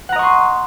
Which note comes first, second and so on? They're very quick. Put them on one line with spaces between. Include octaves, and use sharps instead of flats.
F#5 A#5 D#5 C#6 C6